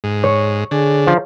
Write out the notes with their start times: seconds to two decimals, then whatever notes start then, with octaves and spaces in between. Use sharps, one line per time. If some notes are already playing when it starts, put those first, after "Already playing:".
0.04 G#2
0.24 C#5
0.71 D3 G#4 G#5
1.07 F3